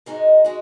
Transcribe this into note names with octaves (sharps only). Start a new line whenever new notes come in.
G#2 G#3 D#4 F#4
G#3 D#4 F#4